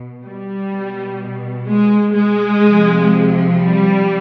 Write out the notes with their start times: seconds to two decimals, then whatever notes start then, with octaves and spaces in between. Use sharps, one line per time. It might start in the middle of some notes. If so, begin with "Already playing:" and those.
Already playing: B2
0.25 G3
0.72 B2
1.68 G#3
2.15 G#3
2.63 C3 F3
3.59 G3